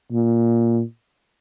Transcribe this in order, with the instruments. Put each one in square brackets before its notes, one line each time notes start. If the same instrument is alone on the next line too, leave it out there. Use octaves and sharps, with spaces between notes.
[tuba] A#2